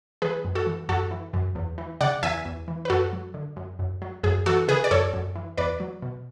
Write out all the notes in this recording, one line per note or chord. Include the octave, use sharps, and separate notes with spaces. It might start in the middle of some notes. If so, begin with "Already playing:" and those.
E3 G#4 B4
F#2
F#4 A4
E3
F#2 F#4 A4
E3
F#2
E2
E3
C#3 D5 F#5
E2 E5 G#5
E2
E3
B4
F#2 F#4 A4
F#3
D3
F#2
F#2
F#3
F#2 G#4
E3 F#4 A4
C#3 G#4 B4
D5
F#2 A4 C#5
F#2
E3
E2 B4 D5
F#3
B2